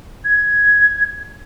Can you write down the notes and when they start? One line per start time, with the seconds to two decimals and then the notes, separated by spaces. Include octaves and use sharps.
0.25 G#6